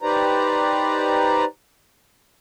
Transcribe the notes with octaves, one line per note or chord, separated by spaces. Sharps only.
D#4 G4 B4 C5 D5 A#5